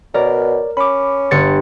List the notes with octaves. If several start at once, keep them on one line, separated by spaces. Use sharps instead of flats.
B2 A#4 C#5 D5
C#4 B5 D6
G1 A6 C#7